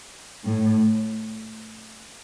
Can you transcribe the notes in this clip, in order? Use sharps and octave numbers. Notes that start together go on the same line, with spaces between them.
A2